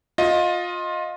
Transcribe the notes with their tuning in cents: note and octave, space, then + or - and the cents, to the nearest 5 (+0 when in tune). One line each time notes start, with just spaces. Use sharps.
F4 +20 D#5 +10